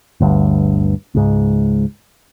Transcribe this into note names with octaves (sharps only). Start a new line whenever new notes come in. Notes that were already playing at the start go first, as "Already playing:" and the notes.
G1 D2 G2
C#2 G#2